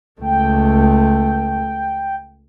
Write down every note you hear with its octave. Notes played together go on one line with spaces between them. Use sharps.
C#2 A3 G5